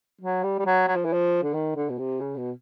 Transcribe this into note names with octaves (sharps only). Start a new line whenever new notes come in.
F#3
G3
G3
F#3
F#3
F3
E3
F3
D3
D#3
D3
B2
C3
C#3
B2